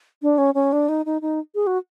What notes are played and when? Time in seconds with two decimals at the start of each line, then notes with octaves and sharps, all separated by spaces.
0.22 D4
0.38 C#4
0.55 C#4
0.73 D4
0.89 D#4
1.06 D#4
1.22 D#4
1.55 G#4
1.67 F#4